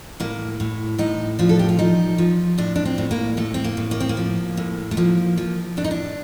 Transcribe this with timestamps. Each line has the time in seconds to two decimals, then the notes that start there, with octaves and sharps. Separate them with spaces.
0.20 A2 A#3
0.60 A2
0.98 A2 D#4
1.39 F3 D4
1.49 A4
1.59 G4
1.69 F4
1.79 F3 D#4
2.18 F3
2.58 A2 D4
2.76 D4
2.85 C4
2.98 A2
3.11 A#3
3.37 A2 A3
3.54 C4
3.64 A#3
3.77 A2
3.91 A#3
4.00 C4
4.09 A#3
4.17 F3
4.57 A2
4.91 A3
4.97 F3 A#3
5.38 F3
5.77 A2 D4
5.84 D#4
5.91 D4